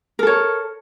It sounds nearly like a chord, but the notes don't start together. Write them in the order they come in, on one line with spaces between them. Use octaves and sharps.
A#4 A4 C#5